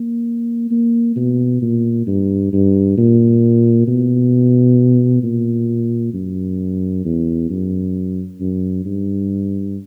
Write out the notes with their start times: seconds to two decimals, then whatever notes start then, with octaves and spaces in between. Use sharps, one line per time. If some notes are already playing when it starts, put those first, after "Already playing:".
Already playing: A#3
0.71 A#3
1.16 B2
1.62 A#2
2.07 G2
2.53 G2
2.98 A#2
3.88 B2
5.23 A#2
6.14 F#2
7.05 E2
7.50 F#2
8.41 F#2
8.85 G2